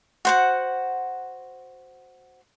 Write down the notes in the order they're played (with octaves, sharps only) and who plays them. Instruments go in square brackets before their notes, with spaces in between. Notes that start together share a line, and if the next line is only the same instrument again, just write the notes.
[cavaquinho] F#4 C5 F#5